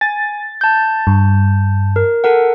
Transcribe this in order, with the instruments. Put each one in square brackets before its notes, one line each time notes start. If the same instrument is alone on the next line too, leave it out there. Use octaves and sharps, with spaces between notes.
[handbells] G#5 [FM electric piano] A6
[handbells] A5 G6
[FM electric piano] G2
[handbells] A#4
A4 A#4 F#5